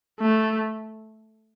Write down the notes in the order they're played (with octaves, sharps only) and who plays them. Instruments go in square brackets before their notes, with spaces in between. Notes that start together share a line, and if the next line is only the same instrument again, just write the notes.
[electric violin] A3